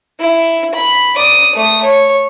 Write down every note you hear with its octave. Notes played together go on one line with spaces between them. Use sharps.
E4
B5
D5 D#6
A3 D#6
C#5